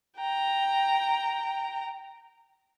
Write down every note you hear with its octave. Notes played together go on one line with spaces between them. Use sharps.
G5 A#5